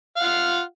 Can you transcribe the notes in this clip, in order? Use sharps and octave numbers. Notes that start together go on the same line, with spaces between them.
F4 F5 F#5